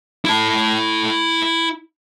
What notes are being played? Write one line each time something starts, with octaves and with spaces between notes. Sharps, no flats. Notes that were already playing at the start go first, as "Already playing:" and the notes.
E4 A5